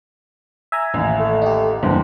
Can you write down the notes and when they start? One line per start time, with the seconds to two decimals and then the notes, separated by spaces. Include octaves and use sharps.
0.72 E5 G#5 A#5
0.94 A1 D#2
1.19 A3
1.42 D#4 G4
1.83 F#1 E2 G2 C5